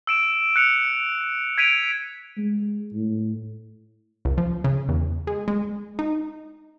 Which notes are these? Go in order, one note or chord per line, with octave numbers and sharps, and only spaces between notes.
E6 D7 E7
F#6 C#7 F7
G#6 B6 D7 D#7 F7
G#3
A2
C#2
F3
C#3
E2
G#3
G#3
D#4